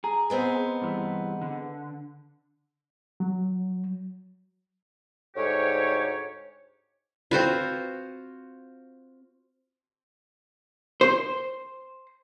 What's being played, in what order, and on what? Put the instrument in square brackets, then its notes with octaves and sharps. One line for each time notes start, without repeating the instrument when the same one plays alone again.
[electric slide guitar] G#4 [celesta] A#5
[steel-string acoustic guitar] G#3 B3 C4
[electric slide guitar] G2 E3
D3
[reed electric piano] F#3
[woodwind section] D2 G#2 G4 C#5
[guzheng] C4 B4 [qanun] F4 F#4 C5
[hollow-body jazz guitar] C5